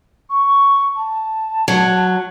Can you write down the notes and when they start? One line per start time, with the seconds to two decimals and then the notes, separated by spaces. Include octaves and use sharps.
0.30 C#6
0.96 A5
1.68 F#3